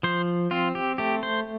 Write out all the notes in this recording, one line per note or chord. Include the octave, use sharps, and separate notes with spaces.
F3 C5
C4 F4
G4
A3 G4
C5